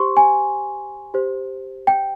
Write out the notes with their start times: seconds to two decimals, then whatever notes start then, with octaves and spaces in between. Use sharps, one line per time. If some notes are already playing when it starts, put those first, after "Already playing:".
Already playing: G4 C5 C6 C#6
0.17 G#5
1.14 G4 C5
1.87 G5